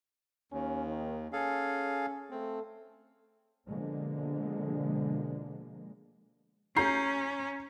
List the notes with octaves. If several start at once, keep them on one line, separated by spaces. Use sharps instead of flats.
D#2 C#4
D#3
C#4 G#4 A4 F5
A3 C4
B2 D3 F3 G#3 A#3
C#4 A#5 G6 C7